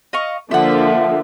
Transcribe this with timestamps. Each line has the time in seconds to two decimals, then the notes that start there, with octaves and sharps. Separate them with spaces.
0.13 D#5 F5 C#6
0.51 D3 F3 A#3 E5 F#5